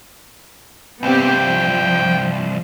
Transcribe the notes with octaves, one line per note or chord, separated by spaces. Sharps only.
C2 G2 B3 C4 G4 G5
F3